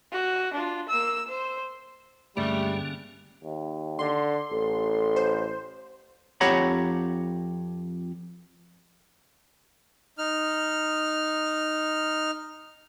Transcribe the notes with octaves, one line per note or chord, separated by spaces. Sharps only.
F#4
D4 F4
A#3 E6
C5
C#2 G2 D3 G3 A3 A#3 C#4
D#2
D3 C6
A1 A4
C5
F2 G4 C#5 F#5 A#5 B5
D#4 F6